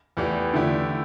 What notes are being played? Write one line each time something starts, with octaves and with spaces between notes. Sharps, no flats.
E2 E3 A3 G4 D5
D3 A3 E4 G4 D5